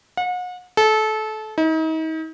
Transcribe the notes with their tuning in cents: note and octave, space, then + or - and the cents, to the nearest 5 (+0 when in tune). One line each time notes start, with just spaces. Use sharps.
F#5 -40
A4 -25
D#4 +40